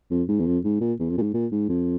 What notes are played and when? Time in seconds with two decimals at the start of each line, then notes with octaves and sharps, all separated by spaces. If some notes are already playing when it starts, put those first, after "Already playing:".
0.11 F2
0.28 G#2
0.39 E2
0.46 F2
0.64 G#2
0.81 A#2
0.99 E2
1.10 F2
1.18 A#2
1.22 G#2
1.34 A#2
1.52 G#2
1.69 F2